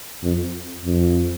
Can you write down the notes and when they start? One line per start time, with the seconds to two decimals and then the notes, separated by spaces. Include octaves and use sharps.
0.23 F2
0.85 F2